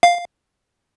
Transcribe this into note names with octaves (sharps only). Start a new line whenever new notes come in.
F5